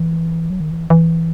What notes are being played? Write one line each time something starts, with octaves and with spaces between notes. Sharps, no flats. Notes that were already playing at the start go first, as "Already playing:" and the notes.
Already playing: E3
F#3
D#3
E3
E3